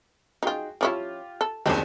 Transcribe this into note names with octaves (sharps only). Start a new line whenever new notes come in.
D#4 F4 F#4 G#4 G5
F3 C#4 E4 F4 G4
A4
F#1 D#2 C3 G3 G#3 C4 D4